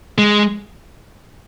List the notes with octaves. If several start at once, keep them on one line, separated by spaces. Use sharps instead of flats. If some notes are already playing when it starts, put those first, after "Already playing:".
G#3